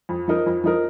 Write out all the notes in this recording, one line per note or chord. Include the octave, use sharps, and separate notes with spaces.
F2
F3 D#4 A#4
F2
F3 D#4 A#4